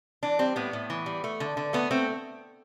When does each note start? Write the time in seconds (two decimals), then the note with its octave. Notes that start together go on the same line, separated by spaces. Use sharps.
0.23 E3 D4
0.39 G3 C4
0.56 A2 B3
0.73 A2
0.90 E3
1.06 G3
1.24 A3
1.40 D3
1.57 D3
1.73 A3 B3
1.91 A3 C4